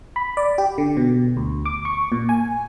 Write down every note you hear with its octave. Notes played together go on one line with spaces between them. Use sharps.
B5
D5
G4
D3
B2
D2
D6
C#6
A#2
G#5